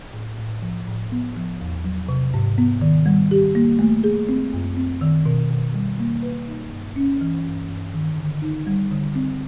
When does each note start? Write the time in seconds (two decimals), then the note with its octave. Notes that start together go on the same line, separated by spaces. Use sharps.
0.13 A2
0.38 A2
0.62 F3
0.87 A2
1.12 B3
1.36 F3
1.61 E2
1.84 F#3
2.09 C3
2.34 G#2
2.58 B3
2.81 D#3
3.06 G3
3.31 G4
3.55 A#3
3.79 A3
4.04 G#4
4.29 C4
4.53 F#2
4.77 C4
5.01 D#3
5.25 B2
5.50 B2
5.74 G3
5.99 A#3
6.23 B4
6.48 D#4
6.72 G2
6.96 C#4
7.21 E3
7.45 G2
7.69 G2
7.94 D#3
8.18 D3
8.42 D#4
8.67 G3
8.91 D3
9.15 C4